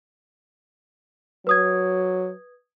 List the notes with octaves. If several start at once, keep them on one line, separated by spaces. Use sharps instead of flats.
F#3 B4 D#6 G#6